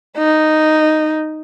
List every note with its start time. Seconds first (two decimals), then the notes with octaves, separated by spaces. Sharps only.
0.18 D#4